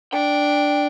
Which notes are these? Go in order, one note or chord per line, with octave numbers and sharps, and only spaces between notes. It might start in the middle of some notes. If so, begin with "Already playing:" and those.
D4 G5